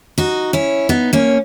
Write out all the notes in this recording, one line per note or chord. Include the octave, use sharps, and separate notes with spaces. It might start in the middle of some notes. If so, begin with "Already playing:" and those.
D#4 F#4
C#4 E4
B3 D#4
A#3 C#4